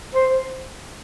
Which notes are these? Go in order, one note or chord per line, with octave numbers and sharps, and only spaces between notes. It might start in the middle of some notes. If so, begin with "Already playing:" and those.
C5